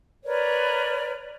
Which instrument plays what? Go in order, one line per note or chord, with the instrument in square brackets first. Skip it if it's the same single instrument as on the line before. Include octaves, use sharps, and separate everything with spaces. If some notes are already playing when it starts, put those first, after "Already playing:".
[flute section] A#4 B4 C#5 D5